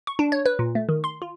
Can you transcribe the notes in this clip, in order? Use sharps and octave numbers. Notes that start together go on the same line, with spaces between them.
C#6
D4
C#5
B4
A#2
A3
D#3
C6
F4